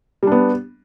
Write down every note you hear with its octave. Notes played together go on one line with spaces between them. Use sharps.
G3 B3 D4